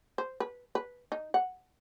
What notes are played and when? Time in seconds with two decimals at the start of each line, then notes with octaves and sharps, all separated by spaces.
0.18 C5
0.40 B4
0.75 B4
1.12 D#4
1.34 F#5